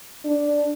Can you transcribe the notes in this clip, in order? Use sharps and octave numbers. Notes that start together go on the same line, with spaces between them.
D4